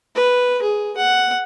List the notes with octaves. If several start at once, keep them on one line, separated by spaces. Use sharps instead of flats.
B4
G#4
F#5